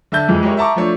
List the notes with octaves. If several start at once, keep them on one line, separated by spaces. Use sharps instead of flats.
D3 E5 A5 G6
F2 E3 G#3
G#3 E4 G4 A#4 C#5
E5 F#5 A5 A#5 C#6 D6
F3 A3 D4 C#5